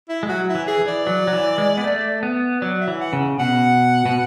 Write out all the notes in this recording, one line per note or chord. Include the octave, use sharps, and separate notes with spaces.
E4
G#3
F#3 F#4
E4
E3
G#4
E3
D5
F#3
F#3
E3
G#3
B3
A3
B3
F#3 D5
E5
E3
F#5
C#3
B2 F#5
B2